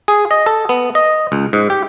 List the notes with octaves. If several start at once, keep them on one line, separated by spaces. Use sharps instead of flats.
G#4
D#5
A4
B3
D#5
C#2
G#2
G4